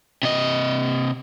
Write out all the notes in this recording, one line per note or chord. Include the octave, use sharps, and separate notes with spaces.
C3 D#5